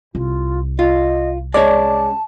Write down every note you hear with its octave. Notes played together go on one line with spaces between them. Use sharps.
C2 F4
F4 D#5
G#3 C#4 C#5 D5 A5